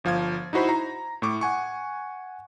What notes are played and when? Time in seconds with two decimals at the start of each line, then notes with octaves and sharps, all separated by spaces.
0.04 G1 F3 F5 G#6
0.53 D#4 E4 F#4 C5 B5
0.69 A#5
1.22 A2 A3 C#6 D6
1.41 F#5 G#5 C#6